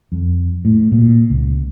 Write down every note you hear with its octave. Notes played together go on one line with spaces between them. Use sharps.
F2
A2
A#2
C#2